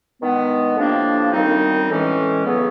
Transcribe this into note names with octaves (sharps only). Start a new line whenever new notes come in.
G2 D#3 G#3 B3
A2 F3 A#3 D4 G4
F#2 D#3 G3 C4 D#4
A2 E3 G#3 C#4
E2 C#3 F#3 B3